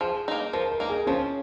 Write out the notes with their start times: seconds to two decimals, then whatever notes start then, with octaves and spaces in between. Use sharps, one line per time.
0.01 F3 G#4
0.28 A#3 D#4
0.53 F3 A#4
0.71 A#4
0.80 A#3 D#4
0.89 G#4
1.07 F3 C#4